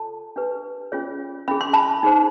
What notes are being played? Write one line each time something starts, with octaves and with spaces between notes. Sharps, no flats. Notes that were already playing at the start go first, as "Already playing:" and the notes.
Already playing: F4 A4 C#5 A5
D4 G4 B4
C#4 F4 G#4 C#5
C#4 E4 G#4 B5
C6
A5 B5
D#4 G#4 C5